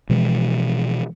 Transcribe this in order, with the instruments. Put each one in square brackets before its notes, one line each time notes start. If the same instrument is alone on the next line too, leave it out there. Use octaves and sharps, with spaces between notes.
[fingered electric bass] B2 E3 F3 G#3